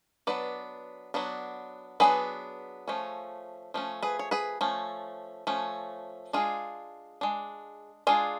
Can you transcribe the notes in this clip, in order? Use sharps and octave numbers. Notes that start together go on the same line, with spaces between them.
F#3 B3 D4 B4 D5
F#3 B3 D4
F#3 B3 D4 G#4 B4
F3 A3 C#4
F3 A3 C#4
G#4 B4
C#5
G#4 B4
F3 A3 C#4
F3 A3 C#4
G#3 D4 F4 G#4
G#3 D4
G#3 D4 F4 G#4